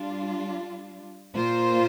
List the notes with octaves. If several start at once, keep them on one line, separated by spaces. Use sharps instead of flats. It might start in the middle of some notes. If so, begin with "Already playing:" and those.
Already playing: G3 D4 F4
A#2 A#3 F4 C5